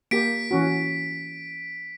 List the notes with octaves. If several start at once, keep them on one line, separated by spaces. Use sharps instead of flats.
A#3 G4 B6 D7
E3 C#4 F#4